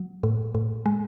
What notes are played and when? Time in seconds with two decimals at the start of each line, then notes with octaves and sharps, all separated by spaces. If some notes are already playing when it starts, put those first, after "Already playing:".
Already playing: F#3
0.23 A2
0.55 A2
0.86 G#3